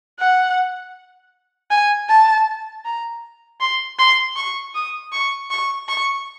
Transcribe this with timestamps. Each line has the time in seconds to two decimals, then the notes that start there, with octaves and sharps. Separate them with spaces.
0.19 F#5
1.71 G#5
2.09 A5
2.85 A#5
3.61 C6
3.99 C6
4.36 C#6
4.75 D#6
5.12 C#6
5.51 C#6
5.89 C#6